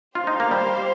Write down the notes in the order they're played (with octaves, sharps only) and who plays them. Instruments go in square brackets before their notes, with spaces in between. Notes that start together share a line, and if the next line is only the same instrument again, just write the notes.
[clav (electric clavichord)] F4 [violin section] G4 C5 F5
[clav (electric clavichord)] D#4
A#3
G3